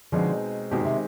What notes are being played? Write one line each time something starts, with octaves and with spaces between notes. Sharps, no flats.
B2 D3 F3 G#3 C4 D#4 G#4
B2 D#3 G#3 C4 G4
C3